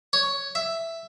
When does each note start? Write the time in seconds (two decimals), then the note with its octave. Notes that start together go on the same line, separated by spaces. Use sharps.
0.13 C#5
0.55 E5